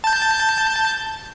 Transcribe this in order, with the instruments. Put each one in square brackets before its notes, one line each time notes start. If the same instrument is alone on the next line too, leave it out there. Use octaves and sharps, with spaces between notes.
[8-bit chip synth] A5 G6